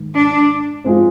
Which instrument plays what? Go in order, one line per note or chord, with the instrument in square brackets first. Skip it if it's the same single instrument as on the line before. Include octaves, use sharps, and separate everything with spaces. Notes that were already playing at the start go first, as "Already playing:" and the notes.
Already playing: [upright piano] G#2 D#3
[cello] D4
[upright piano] F3 G#3 C4